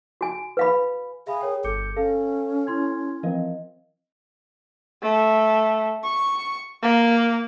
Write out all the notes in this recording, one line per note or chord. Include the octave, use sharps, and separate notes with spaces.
F#4 G#5
B4 F5 B5
G#4 E5 F5 B5
A#4 C#5 G5
G1 A4 D6 G6 C#7
C#4 A4 F5
E4 C6 G#6
E3 F3 C4 A#4 D#5 F5
A3
C#6
A#3